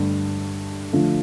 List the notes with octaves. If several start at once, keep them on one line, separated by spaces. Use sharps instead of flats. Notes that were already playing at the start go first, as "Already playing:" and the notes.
Already playing: G2 D3 A3
D3 F3 A3